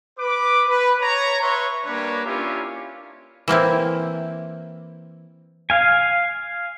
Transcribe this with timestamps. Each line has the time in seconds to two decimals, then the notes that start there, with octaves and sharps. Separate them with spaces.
0.19 B4 D6
0.67 B4
1.01 C#5 A#5
1.41 B4 C#5 E5 C6 C#6
1.85 G3 A#3 D4 B4 C#5
2.24 A#3 C#4 D4 E4 F4 G4
3.48 E3 A#3 C4 E4
5.70 F5 G#5